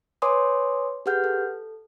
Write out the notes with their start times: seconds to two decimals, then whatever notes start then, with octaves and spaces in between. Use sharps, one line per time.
0.22 B4 C#5 G#5 C6 D6 D#6
1.06 G4 G#4 B4 F#5 F6 G6
1.24 A4